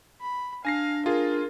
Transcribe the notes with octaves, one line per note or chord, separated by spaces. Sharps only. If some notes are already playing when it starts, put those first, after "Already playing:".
B5
D4 F5 G#5 A#6 C7
F4 G#4 A#4